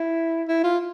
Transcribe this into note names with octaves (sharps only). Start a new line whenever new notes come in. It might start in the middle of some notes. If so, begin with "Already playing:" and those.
Already playing: E4
E4
F4